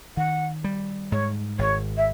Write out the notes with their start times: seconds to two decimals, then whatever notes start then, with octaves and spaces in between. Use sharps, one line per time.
0.17 D#3 F#5
0.64 G3
1.12 G#2 C#5
1.59 G#1 C#5
1.97 E5